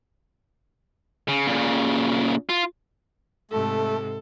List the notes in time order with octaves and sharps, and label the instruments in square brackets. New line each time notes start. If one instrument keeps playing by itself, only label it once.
[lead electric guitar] C#3
A#2 C#3
F4
[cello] G#2 C3 [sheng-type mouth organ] A3 [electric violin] A4